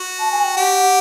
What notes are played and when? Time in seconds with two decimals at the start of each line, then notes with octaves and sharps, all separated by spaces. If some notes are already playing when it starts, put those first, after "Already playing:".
Already playing: F#4
0.19 A5
0.32 G#5
0.44 G5
0.56 G4 F#5